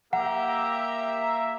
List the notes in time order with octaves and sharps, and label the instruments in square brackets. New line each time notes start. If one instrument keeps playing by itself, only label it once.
[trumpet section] A#3 E5 [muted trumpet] G4 [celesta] F#5 [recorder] A#5